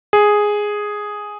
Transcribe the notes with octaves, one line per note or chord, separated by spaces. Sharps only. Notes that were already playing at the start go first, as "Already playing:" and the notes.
G#4